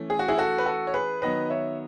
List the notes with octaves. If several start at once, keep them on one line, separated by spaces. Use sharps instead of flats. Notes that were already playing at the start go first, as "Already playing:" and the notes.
Already playing: E3 A3 C#4
G#4
F#4
E4 G#4
F#4 A4
B4
F#4 A4
C#5
G#4 B4
D#3 F#3 B3 B4 D#5
C#5 E5